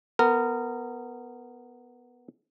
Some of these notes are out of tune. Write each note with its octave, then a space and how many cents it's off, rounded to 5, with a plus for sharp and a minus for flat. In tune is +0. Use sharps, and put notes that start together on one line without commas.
B3 +0 A#4 -20